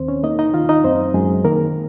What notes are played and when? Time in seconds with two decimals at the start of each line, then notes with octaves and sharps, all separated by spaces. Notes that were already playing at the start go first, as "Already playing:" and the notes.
Already playing: D#2 D#3 C4 C5
0.08 C#4 C#5
0.23 A#3 D#4 D#5
0.39 D#4 D#5
0.54 D#3 F4 F5
0.69 D#4 D#5
0.84 F#2 C4 C5
1.14 F#2 G#3 G#4
1.44 D#3 A#3 A#4